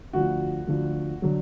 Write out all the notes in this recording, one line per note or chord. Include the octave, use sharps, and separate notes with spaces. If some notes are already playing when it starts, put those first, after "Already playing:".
D2 D3 F3 F#4
D2 D3 F3
D3 F#3